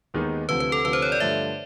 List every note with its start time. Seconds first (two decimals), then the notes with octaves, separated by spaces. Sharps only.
0.14 D#2 D#3 G#3 B3 D#4
0.49 D2 C3 F3 B4
0.60 B4
0.72 A4
0.85 D2 C3 F3 B4
0.93 C5
1.02 C#5
1.12 D5
1.20 G2 D3 F3 A3 E5